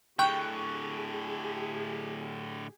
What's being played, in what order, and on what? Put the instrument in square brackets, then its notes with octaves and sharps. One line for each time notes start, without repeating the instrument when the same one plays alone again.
[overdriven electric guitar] A2 D3 [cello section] G4 G#4 [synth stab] G5 [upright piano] C#6 F#6